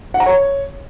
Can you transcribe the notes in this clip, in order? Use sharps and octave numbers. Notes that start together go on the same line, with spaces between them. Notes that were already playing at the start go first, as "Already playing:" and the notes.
F#5
A#5
C#5